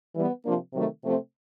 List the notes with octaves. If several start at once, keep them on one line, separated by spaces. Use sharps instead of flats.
E3 G3 B3
C3 F3 A#3 D4
C3 D#3 F#3 A3
C3 F3 A3 C4